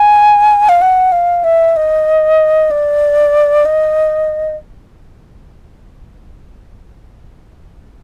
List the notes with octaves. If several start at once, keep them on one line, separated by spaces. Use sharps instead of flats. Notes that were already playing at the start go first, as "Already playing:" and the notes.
Already playing: G#5
F5
F#5
F5
E5
D#5
D5
D#5